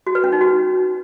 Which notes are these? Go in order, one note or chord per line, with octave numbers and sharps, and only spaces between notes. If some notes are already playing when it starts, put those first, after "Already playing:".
F#4
B4
C#4
D#4
F#4